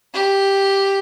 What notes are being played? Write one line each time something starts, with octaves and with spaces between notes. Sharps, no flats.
G4